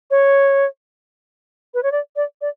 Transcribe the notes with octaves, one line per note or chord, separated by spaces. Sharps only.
C#5
B4
C#5
D5
D5
D5